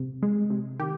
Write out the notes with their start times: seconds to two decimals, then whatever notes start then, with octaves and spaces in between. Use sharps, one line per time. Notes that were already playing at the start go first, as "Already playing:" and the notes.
Already playing: C3
0.22 G#3
0.50 C3
0.79 D#3 G4